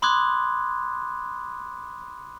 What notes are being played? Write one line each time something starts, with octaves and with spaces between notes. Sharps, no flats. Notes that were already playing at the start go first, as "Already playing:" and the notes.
B5 C6 D6 D#6 F#6 G#6